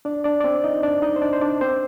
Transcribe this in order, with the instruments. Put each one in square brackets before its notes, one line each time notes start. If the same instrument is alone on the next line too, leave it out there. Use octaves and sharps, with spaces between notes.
[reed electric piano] D4 D5
D4 D5
D5
C4 C5
D#4 D#5
D4 D5
D#4 D#5
C5
D4 D5
C5
D4 D5
C4 C5